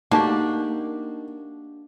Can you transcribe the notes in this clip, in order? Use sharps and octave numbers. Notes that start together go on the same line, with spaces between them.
A3 A#3 D4 D#4 F#4 G4 A5